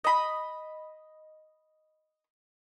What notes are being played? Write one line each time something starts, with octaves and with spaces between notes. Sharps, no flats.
D#5 B5